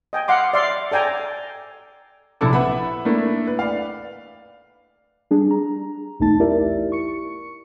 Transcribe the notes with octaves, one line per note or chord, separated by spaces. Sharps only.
D#5 G5 G#5
F5 F#5 C6 D6
D5 E5 F5 C6
A4 D5 G5 G#5 A#5
A#1 C3 E4 A4 D6
B4 E5 F#5 B5
A3 A#3 D4 E4
B4
D5 F5
G3 D4 G#4
A#5
B1 E2 A3 D#4 A5 A6
E4 G4 A#4 D5 E5
C#6 C#7